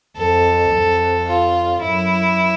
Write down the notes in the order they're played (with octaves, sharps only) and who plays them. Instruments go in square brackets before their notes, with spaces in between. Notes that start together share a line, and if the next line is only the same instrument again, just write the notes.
[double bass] F2 [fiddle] A4
[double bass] F2
[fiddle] F4
[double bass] F#2 [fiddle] E4